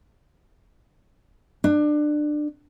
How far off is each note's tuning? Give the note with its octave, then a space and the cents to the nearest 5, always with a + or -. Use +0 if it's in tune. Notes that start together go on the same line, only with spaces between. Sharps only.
D4 +25